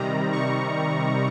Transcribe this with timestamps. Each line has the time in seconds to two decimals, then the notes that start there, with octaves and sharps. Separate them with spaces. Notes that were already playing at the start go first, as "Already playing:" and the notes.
Already playing: C3 D#3 G3 A#5
0.32 C#6